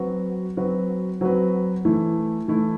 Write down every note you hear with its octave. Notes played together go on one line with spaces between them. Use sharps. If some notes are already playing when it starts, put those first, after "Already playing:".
Already playing: F#3 C4 F#4 B4
F#3 C4 F#4 B4
F#3 C4 F#4 B4
E3 A3 E4
E3 A3 E4